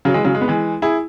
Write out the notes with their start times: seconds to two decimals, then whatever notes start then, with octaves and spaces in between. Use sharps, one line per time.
0.05 C#3 F#3
0.14 E3 G#3
0.24 C#3 F#3
0.35 G#3
0.41 B3
0.48 E3 G#3
0.82 E4 G#4